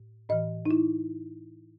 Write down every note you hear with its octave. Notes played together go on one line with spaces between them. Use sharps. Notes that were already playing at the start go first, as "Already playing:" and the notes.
Already playing: A2
A2 E3 D#5
D#4
E4